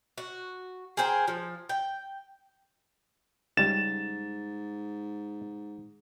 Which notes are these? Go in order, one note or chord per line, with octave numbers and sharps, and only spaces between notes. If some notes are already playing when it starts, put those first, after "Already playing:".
F#4
G#4 A#4 C5 G5
F3
G5
C#2 G#2 G3 A6 E7